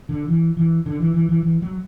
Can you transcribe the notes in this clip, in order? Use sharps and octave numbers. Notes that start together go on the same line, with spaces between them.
D3
E3
E3
D3
E3
E3
E3
E3
F#3